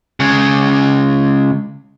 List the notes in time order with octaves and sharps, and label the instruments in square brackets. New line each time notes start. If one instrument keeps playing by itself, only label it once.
[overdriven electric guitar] C#3 G#3